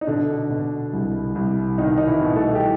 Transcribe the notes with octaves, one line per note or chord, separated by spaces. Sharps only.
D#4
B2 D3 D4
B2
C2
C2
B2 D#3 D#4
D#4
E3 E4
B2
A3 A4
G4